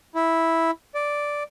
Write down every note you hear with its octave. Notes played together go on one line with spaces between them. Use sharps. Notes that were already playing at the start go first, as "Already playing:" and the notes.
E4
D5